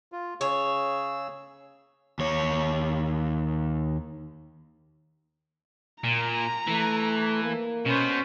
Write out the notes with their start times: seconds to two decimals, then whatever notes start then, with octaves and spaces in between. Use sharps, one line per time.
0.12 F4
0.41 C#3 G#4 C#5 E6
2.19 D#2 C#5
6.04 A#2 A#5
6.68 E3 A3
7.43 A#3
7.86 B2 B3 C#4 C5